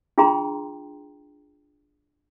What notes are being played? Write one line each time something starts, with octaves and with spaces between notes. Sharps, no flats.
D4 F4 G#4 G5 A#5 C6